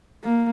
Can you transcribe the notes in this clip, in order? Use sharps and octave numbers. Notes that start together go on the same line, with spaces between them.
A#3